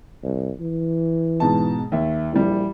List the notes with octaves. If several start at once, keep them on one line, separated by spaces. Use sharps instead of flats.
C2
E3
G#2 B2 A5
D#2 E5
A#1 E3 G3